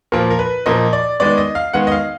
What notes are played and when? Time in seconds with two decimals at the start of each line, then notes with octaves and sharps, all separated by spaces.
0.12 A#2 F3 A#3 A#4
0.31 A#4
0.39 B4
0.66 A#2 F3 A#3 D#5
0.93 D5
1.20 D#3 G#3 B3 D5
1.38 D#5
1.55 F5
1.73 D#3 G#3 B3 F#5
1.87 D#5
1.92 F5